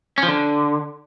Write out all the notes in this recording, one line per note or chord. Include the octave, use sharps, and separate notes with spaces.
C#4
F3
D3